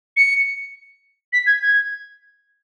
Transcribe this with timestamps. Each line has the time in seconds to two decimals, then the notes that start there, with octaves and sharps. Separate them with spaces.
0.17 C#7
1.33 B6
1.47 G#6
1.62 G#6